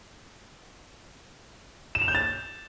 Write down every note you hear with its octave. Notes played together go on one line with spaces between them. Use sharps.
E7
F7
G6
A6